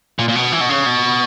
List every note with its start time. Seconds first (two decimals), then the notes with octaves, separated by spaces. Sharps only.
0.19 A#2
0.29 A#2
0.35 B2
0.52 E3
0.61 B2
0.69 C#3
0.86 B2